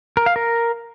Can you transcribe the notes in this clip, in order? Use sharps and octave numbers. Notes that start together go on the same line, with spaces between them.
A#4
F5
A#4